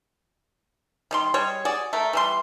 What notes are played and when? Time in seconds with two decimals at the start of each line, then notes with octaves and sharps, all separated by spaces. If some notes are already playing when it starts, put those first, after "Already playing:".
1.11 D#3 G3 C6
1.34 G3 G#3 C#5
1.65 F#4 G#4 D5
1.93 A3 A#4
2.13 E3 G3 C6